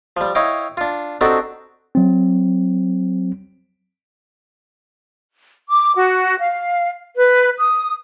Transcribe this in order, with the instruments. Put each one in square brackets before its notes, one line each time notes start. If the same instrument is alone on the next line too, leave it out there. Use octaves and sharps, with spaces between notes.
[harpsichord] F3 G3
E4 C#5 D#5 F5 G5
D4 F4
C4 D4 D#4 F#4 G4 A4
[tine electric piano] F#3 C4
[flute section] D6
F#4
F5
B4
D#6